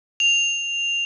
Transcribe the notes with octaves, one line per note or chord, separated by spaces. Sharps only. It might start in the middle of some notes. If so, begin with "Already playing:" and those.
F7